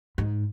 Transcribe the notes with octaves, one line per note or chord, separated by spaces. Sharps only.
G#2